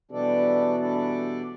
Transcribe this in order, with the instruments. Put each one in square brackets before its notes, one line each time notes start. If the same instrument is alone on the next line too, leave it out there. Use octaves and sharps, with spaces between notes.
[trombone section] B2 E3 [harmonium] G3 D4 A4 D5
[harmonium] G3 D4 A4 D5